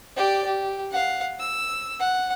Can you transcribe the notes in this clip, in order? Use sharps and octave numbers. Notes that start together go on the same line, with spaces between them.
G4 D5
G4
F5 F#5
E6
F#5